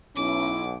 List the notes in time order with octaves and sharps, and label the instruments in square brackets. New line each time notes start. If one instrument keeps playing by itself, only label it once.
[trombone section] B1 [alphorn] C#4 [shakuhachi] E4 [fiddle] D6